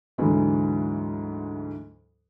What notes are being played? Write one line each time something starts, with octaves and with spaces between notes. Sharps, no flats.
D2 G#2 D3 E3 F#3